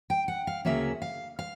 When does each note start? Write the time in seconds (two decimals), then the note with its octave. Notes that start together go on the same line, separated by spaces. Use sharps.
0.10 G5
0.28 F#5
0.47 F5
0.65 D2 C#3 F#3 A#3 C#4 E5
1.02 F5
1.39 F5